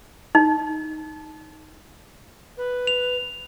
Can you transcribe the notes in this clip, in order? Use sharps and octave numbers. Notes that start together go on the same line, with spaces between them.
D#4
B4
F7